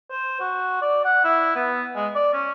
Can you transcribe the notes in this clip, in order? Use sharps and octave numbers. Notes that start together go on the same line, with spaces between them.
C5
F#4
D5
F#5
E4
B3
G#3
D5
C#4